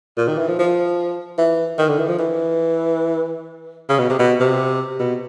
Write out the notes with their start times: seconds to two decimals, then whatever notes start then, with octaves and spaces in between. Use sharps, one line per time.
0.18 A#2
0.28 D#3
0.38 E3
0.48 F3
0.59 F3
1.38 E3
1.78 D#3
1.89 D3
1.99 E3
2.08 F3
2.19 E3
3.89 C#3
3.99 B2
4.10 C3
4.19 B2
4.40 C3
5.00 B2